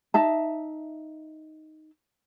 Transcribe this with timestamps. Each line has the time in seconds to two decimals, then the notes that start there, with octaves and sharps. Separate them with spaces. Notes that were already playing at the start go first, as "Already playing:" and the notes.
0.14 D#4 E5 A5